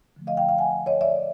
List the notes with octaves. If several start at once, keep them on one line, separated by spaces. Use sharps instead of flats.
D3 F3 A3
D#5 F5
F5 G5
F5 G5
F#5 G#5
C#5 D#5
D5 E5